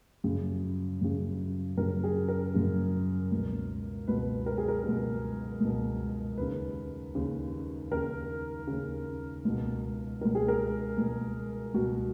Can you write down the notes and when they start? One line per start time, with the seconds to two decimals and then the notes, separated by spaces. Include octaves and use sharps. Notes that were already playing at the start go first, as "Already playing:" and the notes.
0.24 F#2 C#3
1.02 F#2 C#3
1.77 F#2 C#3 A#4
2.04 G#4
2.28 A#4
2.54 F#2 C#3
3.32 C#2 B2
4.08 C#2 B2 B4
4.46 A#4
4.58 G#4
4.68 A#4
4.84 C#2 B2
5.60 C#2 B2
6.37 D#2 C#3 B4
7.15 D#2 C#3
7.91 D#2 C#3 A#4
8.67 D#2 C#3
9.45 C#2 B2
10.21 C#2 B2 A#4
10.35 G#4
10.48 A#4
10.97 C#2 B2
11.74 C#2 B2 F#4